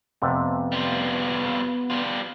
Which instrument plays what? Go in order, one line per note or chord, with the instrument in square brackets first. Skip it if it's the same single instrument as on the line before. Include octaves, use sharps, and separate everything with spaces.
[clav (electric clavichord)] F2 C3 A3 [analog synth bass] B3
[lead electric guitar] G3 F4
G3 F4